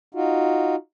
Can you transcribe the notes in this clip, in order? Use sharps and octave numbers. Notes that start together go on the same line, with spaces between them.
D#4 F4 F#4